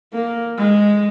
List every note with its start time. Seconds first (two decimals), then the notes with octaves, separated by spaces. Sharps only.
0.14 A#3
0.58 G#3